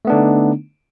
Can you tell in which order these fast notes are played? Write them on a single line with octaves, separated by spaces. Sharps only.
A3 B3 D4 D3 D#4